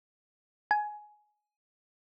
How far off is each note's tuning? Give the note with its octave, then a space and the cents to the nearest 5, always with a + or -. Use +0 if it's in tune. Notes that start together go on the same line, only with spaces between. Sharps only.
G#5 +15